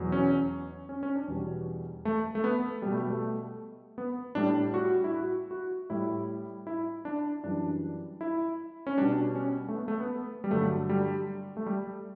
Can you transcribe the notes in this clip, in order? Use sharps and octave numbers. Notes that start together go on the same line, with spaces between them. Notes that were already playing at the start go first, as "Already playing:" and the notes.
Already playing: E2 B2 F#3
C#4
C#4
C#4
D4
E2 B2 G3
A3
A3
B3
B2 G3
A3
G3
A3
B3
A2 G3 D4
F#4
E4
F#4
F#4
A2 G3 E4
E4
D4
F#2 E3 G3 D4
E4
C#4
B2 G3 D4
C#4
A3
B3
A3
B3
G3
G2 D3 F#3 A3
G3
A3
G3